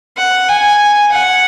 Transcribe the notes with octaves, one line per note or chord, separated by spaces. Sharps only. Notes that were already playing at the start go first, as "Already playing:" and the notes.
F#5
G#5
F#5